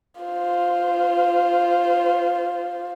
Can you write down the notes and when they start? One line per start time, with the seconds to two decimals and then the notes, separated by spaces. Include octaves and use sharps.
0.21 F4 C5